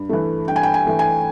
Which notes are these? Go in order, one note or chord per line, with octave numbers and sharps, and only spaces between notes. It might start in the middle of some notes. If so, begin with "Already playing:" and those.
Already playing: G2
E3 A3
G2 G5
G#5
G5
G#5
E3 A3
G#5